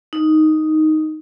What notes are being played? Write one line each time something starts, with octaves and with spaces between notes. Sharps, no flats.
D#4